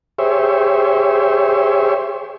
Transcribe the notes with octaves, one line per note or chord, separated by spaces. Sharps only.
G4 G#4 C5 C#5 E5